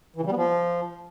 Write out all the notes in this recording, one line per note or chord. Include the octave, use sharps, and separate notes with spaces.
E3
C#3
G3
B3
F3